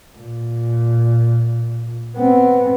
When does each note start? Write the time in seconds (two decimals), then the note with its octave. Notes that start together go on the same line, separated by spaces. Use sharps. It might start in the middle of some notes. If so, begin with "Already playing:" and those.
0.18 A#2
2.17 B3 C4